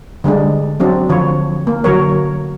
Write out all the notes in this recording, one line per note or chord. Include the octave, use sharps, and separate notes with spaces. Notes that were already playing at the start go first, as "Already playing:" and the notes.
D3 G3 G#3 D4
F#3 C4 D4
D3 F3 C#5
A#3
D3 F#3 A#4 C#5